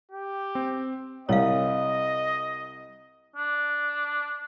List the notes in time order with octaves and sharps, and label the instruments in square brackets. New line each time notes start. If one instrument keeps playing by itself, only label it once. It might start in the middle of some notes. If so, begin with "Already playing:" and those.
[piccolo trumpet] G4
[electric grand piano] C4
[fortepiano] C2 [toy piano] C#5 F5 [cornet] D#5
[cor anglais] D4